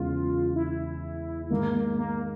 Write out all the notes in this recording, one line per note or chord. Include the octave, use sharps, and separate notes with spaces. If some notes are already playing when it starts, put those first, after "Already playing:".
Already playing: E2 C#3 E3 G#3 F4
E4
G#2 D#3 G#3 A#3
A#3
A#3